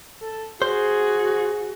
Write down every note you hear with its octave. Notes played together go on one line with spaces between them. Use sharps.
A4
F#4 G#4 C5